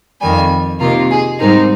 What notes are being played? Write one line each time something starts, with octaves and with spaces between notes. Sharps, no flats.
F2 D#3 G3 G#5
C3 D#3 A#3 F4 A#4
G#4
G#2 G3 C4 D#4 A#4